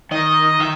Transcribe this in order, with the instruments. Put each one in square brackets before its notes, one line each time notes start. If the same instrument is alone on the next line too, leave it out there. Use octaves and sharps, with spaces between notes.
[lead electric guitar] D#3 [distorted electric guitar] D#5
[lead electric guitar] D#3 [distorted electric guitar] E5